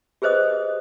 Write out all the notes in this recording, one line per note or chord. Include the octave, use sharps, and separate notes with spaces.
G4 G#4 B4 C5 D#5 D#6